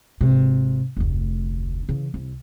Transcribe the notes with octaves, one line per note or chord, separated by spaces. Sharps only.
G#1 C3
F1 D2
C#3 E3
C2